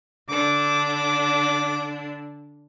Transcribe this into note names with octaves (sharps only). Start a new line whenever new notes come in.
D3 D4 D6